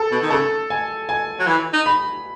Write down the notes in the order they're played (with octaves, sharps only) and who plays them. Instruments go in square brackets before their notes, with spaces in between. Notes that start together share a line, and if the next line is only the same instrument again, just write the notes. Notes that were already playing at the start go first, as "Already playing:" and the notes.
Already playing: [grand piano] A4
[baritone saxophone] B2
D#3
[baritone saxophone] C#3 [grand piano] A4
[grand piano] G#5
G#5
[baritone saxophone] F#3
E3
D#4
[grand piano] B5